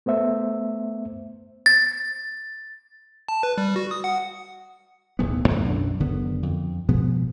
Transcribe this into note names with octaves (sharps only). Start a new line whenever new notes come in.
A3 B3 C5 E5
A6
A5
B4
G3
F#4
D#6
F#5
D1 B1 E2 B3
E2 G#2 F#3 A3
B1 F#2 F#3 D4
F#1 D3 F#3 B3
F2
B2 F3 G#3 B3